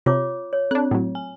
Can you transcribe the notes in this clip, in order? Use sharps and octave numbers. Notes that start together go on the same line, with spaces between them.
C3 F4 C#5 D6
C#5
C4 D4 F#6
A2 F#3
G#5